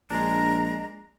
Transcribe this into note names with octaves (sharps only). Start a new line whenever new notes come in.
A#1 G#3 D4 A#5